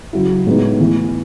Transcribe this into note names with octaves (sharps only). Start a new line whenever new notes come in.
C#3 F#3 C#4 E4
A2 G#3 B3 D#4
E3 B3 E4